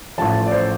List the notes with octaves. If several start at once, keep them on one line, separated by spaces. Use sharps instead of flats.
A1 A2 F3 A5
D5
C5